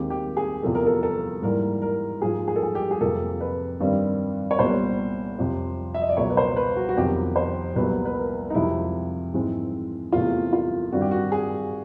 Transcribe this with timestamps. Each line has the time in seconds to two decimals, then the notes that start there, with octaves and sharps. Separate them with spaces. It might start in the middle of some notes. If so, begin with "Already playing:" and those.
Already playing: D#2 D#3 G#3 C4 G4
0.10 G4
0.37 G#4
0.63 E2 C3 F3 A#3 A4
0.75 A#4
0.86 A4
1.03 A4
1.42 G#2 E3 G3 A#3 A#4
1.82 A#4
2.22 G#2 F3 A#3 G#4
2.48 G#4
2.56 A4
2.63 G#4
2.75 G4
2.91 G#4
3.00 F2 C3 F3 A#3 A4
3.41 B4
3.80 G2 D#3 G3 C4
4.51 C#5
4.59 C2 A#2 G3 B3 C5
5.39 F2 C3 F3
5.94 E5
6.02 D#5
6.09 D5
6.17 C#2 B2 F#3 C#5
6.30 B4
6.37 C5
6.56 B4
6.76 F#4
6.89 F#4
6.96 F2 C3 D#3 F#3 B3 G4
7.36 C5
7.76 C2 A#2 F#3 B3 B4
8.05 B4
8.15 A#4
8.50 D#4
8.55 F2 C3 F3 G#3 E4
9.34 G#2 E3 G#3 C4
10.12 E2 C3 E3 A3 F4
10.53 F4
10.92 G2 D#3 G3 C4 F#4
11.01 G4
11.11 F#4
11.32 G#4